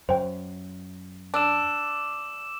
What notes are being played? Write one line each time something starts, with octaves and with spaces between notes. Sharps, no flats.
F#2 C5 G5
D4 D6 E6 E7